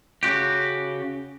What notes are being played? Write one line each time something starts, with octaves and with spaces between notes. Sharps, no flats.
C#3 F#4 G4